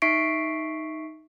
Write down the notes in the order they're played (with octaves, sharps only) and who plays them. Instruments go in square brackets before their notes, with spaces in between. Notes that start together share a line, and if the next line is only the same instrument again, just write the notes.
[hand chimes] D#4 E5 C#6 B6 C7 D7